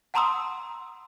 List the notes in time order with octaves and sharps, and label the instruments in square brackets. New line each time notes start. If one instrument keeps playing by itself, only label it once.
[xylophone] F#5 A5 A#5 C6 D#6 E6